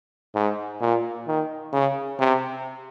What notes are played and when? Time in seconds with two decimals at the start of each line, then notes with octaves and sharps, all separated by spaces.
0.35 G#2
0.81 A#2
1.27 D#3
1.73 C#3
2.20 C3